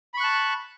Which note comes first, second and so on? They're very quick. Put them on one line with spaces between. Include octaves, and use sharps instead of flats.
B5 C#6 F#6 A5